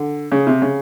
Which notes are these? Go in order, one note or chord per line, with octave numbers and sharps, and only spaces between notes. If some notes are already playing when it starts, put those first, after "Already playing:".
Already playing: D3
C#3
C3
C#3